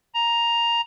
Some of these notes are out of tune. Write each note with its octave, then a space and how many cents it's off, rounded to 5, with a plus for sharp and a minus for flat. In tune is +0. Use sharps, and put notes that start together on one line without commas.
A#5 +5